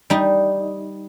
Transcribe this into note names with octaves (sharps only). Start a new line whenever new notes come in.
G3 D#4